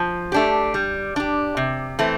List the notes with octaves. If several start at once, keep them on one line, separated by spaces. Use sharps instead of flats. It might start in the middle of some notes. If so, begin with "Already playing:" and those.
Already playing: F3
A3 D4 G4
G3
D4 G4
C3
E3 A3 C4